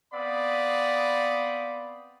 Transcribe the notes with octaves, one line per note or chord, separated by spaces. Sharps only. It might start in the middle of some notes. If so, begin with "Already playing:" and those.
B3 C4 D5 F5 B5 D#6